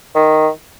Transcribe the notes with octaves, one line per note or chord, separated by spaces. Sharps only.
D#3